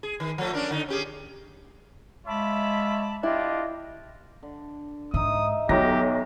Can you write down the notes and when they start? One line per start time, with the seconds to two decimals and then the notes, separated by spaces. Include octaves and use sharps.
0.03 G#4
0.20 D#3
0.38 F3 A3
0.53 C#4 D4 A#4
0.71 D3 D#4
0.88 C#4 G4 G#4
2.27 G#3 F4 C#5 E5 A5 B5 D6
3.23 D4 E4 F4 G4 D#5
4.43 D3
5.14 G#2 D#4 E5 D#6
5.69 B1 F#3 B3 G4 A#6